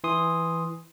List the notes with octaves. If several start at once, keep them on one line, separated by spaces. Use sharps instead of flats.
E3 C6 D#6